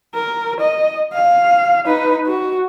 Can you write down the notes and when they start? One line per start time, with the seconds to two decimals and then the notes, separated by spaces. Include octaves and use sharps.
0.15 A#4
0.60 D#5
1.13 F5
1.86 D#4 B4
2.27 F#4